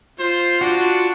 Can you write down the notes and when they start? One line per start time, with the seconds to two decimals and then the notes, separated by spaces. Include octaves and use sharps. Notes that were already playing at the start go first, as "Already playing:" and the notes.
0.19 F4 C5
0.61 D4 F#4